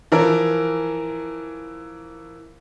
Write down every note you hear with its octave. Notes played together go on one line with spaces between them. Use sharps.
E3 F3 A#4